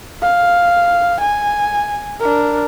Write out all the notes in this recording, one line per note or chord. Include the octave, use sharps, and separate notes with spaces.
F5
G#5
D4 A#4